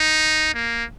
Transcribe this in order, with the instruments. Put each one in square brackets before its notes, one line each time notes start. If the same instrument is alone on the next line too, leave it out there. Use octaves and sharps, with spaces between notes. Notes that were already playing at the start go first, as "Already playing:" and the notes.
Already playing: [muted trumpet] D#4
A#3